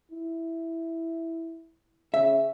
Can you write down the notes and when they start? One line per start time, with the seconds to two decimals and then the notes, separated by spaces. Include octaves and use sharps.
0.12 E4
2.14 C#3 E5